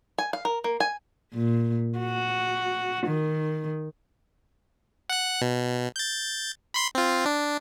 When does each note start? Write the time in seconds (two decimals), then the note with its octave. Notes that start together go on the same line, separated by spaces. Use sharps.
0.18 G#5
0.33 F5
0.45 A#4
0.64 A#3
0.80 G#5
1.33 A#2
1.99 F#4
3.07 D#3
5.10 F#5 F#6
5.41 B2
5.96 G6 A6
6.74 B5 C6 C7
6.95 C4 F4
7.26 D4